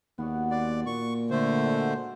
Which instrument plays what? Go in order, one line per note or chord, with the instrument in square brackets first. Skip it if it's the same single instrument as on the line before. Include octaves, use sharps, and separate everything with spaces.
[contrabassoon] D#2 [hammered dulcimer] B3 F#4 D5
[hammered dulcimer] B4 C6 [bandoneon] D5
[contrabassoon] A#2 [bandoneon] C#6
[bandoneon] D3 A3 C5
[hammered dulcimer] G#3 F#4 D5